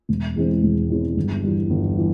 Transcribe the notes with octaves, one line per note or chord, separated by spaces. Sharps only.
E1
E2 E3 G#3 C4
E1
E2 E3 G#3 C4
G1
G2 E3
G1
E3